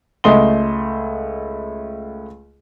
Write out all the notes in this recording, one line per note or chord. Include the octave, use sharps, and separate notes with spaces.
C#2 A3 D#5 C6 G7